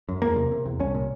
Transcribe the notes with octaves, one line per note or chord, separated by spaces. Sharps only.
F#2
E2 A#3
C3
C3
E2
C2 C#4
A#2